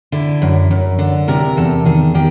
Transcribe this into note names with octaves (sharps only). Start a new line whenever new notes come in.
D3 E4
F#2
F#2
D3
C3 A#4
E2 A4
D#3 G#4
D#3 G4